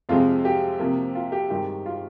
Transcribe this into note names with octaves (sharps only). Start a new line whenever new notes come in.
F2 C3 F3 G#3 F4
G4
C3 F3 A#3
F4
G4
G2 D#3 G#3 G4
F4